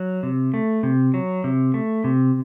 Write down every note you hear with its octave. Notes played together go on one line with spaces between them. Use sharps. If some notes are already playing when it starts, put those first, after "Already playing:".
Already playing: F#3
C3
A3
C3
F#3
C3
A3
C3